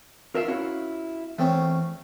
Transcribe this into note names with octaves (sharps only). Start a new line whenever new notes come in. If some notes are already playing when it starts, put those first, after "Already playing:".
F4 A#4 E5 F5
C#4 E4 F#4
E2 A3 C4 C#4